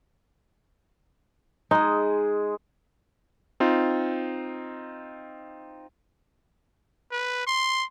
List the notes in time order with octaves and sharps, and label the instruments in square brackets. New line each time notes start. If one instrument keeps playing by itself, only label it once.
[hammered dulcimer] G#3 G#4 [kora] D#4
[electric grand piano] C4 D#4 F4
[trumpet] B4
C6